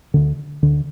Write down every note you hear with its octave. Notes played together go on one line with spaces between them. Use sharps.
D2 D3
D2 D3